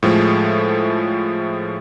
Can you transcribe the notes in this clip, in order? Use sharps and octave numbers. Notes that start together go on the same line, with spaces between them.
A2 F3 G#3 A3